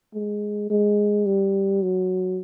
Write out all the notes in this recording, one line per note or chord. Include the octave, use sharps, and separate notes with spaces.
G#3
G#3
G3
F#3